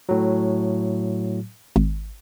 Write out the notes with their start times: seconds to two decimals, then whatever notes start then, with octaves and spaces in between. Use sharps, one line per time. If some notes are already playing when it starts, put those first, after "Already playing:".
0.09 A2 F#3
1.76 G#1